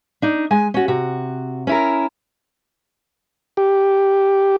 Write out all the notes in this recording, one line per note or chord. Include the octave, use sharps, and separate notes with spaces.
D4 D#4
G#3 G#5
C#4 F#4
C3 F#4
C#4 E4 A#4
G4